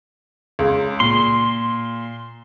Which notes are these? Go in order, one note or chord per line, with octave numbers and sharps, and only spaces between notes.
C#2
A#2 C6